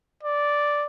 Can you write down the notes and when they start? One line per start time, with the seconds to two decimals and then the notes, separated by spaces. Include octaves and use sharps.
0.23 D5